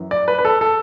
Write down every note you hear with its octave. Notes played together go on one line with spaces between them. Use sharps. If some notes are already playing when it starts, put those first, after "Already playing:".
Already playing: F#2 E3
D5
B4
B4
A4
A4